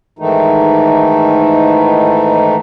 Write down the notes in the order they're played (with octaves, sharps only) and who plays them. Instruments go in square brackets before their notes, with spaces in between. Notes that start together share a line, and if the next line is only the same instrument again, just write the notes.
[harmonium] G#2 D#3 E3 A3 D#4